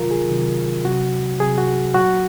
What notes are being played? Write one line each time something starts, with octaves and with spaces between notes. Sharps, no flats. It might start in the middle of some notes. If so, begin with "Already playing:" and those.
Already playing: C3 D#3 F#3 F4 A#4
G#4
C3 D#3 F#3
C3 F#3 F#4
C3 F#3 G#4
F#4
A#2 F#3 F#4